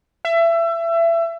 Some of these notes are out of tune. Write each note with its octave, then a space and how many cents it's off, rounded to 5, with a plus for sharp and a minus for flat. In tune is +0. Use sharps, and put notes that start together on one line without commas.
E5 +25